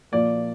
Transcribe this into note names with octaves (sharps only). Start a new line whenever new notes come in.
A#2 F3 A#3 D5